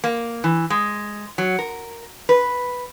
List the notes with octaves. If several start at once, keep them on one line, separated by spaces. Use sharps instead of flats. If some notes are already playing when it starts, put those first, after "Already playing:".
A#3
E3
G#3
F#3
A#4
B4